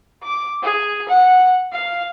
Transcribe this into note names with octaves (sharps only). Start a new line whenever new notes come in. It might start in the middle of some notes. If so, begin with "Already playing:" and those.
D6
G#4
F#5
F5